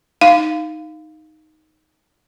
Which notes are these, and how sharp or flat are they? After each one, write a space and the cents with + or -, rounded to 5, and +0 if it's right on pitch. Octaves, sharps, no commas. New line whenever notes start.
D#4 +0 F5 +0